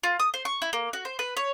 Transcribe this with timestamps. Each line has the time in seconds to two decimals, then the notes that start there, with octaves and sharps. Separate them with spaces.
0.03 F4
0.20 D#6
0.34 C5
0.45 C#6
0.62 E4
0.73 A#3
0.93 F#4
1.05 C5
1.19 B4
1.37 C#5